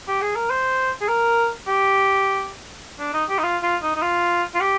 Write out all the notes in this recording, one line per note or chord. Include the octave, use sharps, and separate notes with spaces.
G4
G#4
A#4
C5
G#4
A#4
G4
D4
D#4
G4
D#4
F4
F4
D#4
D#4
F4
F4
G4